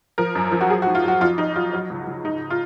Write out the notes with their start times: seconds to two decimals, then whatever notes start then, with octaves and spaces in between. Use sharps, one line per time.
0.18 F3 A#4
0.35 F#2
0.52 F3
0.61 F#4
0.69 F#3 G#4
0.82 F#4
0.87 G#2
0.95 F4
1.04 F#3 F#4
1.21 F2 F4
1.38 F2 D#4
1.55 F#3 F4
1.73 F#3
1.90 C#2
2.07 C#2
2.24 G#2 D#4
2.50 F4